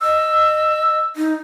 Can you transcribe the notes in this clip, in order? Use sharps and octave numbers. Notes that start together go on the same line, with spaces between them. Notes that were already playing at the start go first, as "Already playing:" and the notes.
D#5 E6
D#4